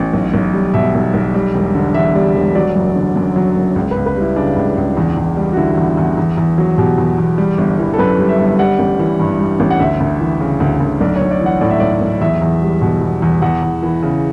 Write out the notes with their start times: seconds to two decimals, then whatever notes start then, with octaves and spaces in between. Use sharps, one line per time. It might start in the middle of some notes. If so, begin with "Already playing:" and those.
Already playing: A1
0.13 B1
0.34 B1
0.54 G3
0.74 B2 E5
0.95 B1
1.14 B1
1.34 G3
1.54 E1
1.75 D3
1.94 E2 E5
2.15 G3
2.35 E1
2.55 F#3 D5
2.76 F#1
2.96 D3
3.16 F#2
3.36 F#3
3.56 F#1
3.76 C#2
3.91 C#2 B4
4.06 B4
4.16 G3
4.21 E4
4.36 C#3 D4
4.56 C#2
4.77 C#2
4.97 E2
5.17 E2
5.37 G3
5.53 F#4
5.57 D3 E4
5.77 E2
5.97 E2
6.17 E2
6.37 E2
6.58 F#3
6.78 B2 G4
6.98 E2
7.18 E2
7.38 G3
7.58 G1
7.79 E3
7.94 A4
7.99 F#2 B4
8.19 G3
8.29 E5
8.39 G1
8.59 G3 F#5
8.79 A1
8.99 E3
9.19 G2
9.39 G3
9.60 A1
9.70 F#5
9.80 D2 E5
10.00 D2
10.20 E3
10.40 C#3
10.60 D2
10.80 D2
11.01 B1 D5
11.16 C#5
11.21 B1
11.31 D5
11.41 E3 F#5
11.61 A2 D5
11.70 E5
11.80 B1 D5
12.01 B1
12.21 E2 E5
12.42 E2
12.62 G3
12.82 B2
13.02 E2
13.22 E2
13.42 E2 F#5
13.62 E2
13.83 E3
14.02 C#3